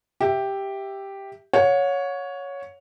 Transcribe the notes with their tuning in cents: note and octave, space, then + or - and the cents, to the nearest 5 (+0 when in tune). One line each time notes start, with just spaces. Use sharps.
G4 +0 E5 +0
C#5 +5 F#5 -40